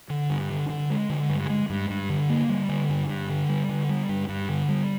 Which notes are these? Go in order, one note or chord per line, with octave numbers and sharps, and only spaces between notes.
D3
G2
D3
D3
G#3
D3
G2
G#3
G2
G2
D3
A#3
G3
D3
G2
G2
D3
G3
D3
G3
G2
G2
D3
G3